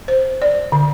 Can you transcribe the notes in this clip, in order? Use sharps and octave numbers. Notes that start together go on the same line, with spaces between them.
C5
D5
D3